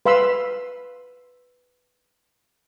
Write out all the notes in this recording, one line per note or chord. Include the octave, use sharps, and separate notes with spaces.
B4 F5 B5 C6 E6